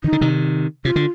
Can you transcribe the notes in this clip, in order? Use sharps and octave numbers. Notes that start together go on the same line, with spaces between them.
D#3 D#4
D3
C3 D#3
C3 F4
D3